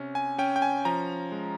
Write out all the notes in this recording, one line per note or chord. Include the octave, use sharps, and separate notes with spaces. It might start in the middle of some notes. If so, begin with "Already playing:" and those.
Already playing: C3 C#4
G#5
C#4 G5
G5
G#5
F3 A#5
G#3